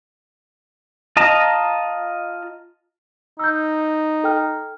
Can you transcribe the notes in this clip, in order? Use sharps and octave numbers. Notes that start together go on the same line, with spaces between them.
F4 D#5 A5 A#5
D#4 E6 G6
A4 G5 F6